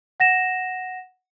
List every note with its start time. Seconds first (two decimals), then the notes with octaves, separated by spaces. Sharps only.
0.20 F#5 A#6 E7